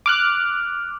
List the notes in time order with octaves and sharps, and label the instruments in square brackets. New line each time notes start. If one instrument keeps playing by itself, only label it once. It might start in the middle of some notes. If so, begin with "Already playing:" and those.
[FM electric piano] D6 F6 F#6